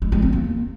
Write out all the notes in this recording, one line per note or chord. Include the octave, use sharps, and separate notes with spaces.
G#3
G#3
C4
A#3